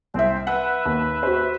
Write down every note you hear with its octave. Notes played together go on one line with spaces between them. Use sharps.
C2 C4 E5
B4 E5 F#5
D#2
F#4 C5